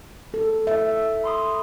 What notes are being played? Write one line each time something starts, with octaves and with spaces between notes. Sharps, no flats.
A4
E5
B5 C6 D#6